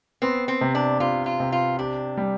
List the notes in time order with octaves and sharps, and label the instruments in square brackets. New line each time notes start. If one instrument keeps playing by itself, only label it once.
[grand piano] B3 [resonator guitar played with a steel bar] C4
[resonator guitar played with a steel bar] C4
[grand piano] C3
[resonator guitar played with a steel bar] D4
[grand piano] C3 [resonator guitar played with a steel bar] F4
[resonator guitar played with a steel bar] F4
[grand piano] C3
[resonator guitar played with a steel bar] F4
[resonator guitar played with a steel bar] D4 [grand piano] G4
[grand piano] G3